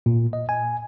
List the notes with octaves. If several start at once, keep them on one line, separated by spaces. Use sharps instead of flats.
A#2
D#5
G#5